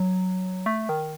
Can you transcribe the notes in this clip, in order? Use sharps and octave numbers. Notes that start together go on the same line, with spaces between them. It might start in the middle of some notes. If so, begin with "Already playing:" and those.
Already playing: F#3
A3
D#3